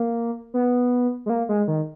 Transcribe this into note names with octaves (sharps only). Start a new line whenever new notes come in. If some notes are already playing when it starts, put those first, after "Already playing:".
Already playing: A#3
B3
G#3
A#3
G#3
D#3